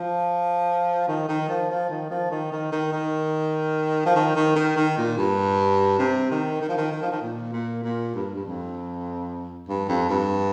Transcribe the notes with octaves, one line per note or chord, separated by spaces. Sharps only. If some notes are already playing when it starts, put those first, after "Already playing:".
Already playing: F3
D#3
D#3
F3
F3
D#3
F3
D#3
D#3
D#3
D#3
F3
D#3
D#3
D#3
D#3
A#2
G2
C3
D#3
D#3
F3
D#3
D#3
F3
D#3
A#2
A#2
A#2
G2
G2
F2
G2
F2
G2